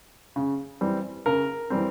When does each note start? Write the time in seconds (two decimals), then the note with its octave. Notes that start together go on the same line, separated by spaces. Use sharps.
0.36 C#3
0.81 E3 G3 C4
1.26 C#3 A#4
1.70 E3 G3 C4